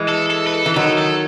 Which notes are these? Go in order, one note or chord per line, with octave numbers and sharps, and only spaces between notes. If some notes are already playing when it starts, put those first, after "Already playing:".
Already playing: E3 G#3
A4
A4
B4
A4
E3
D#3 F#3 A4
A4